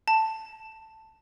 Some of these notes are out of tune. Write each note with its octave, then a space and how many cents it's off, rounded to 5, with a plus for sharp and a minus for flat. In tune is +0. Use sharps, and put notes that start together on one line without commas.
A5 +10